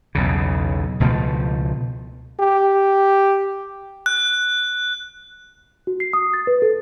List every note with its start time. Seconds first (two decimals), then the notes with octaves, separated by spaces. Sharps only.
0.15 B1 E2 C#3
1.00 C#2 B2 F3 A3
2.40 G4
4.06 F#6
5.87 F#4
6.00 C7
6.13 D#6
6.34 A6
6.47 B4
6.62 A4